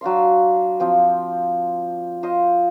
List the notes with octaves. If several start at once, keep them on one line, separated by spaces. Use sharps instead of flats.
F#3 D4 F5 C6
F3 C4
F4 C5 D#5